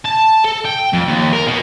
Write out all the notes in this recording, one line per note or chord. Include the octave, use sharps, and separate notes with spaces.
A5
A4
G5
F2
D#2
A#4
B2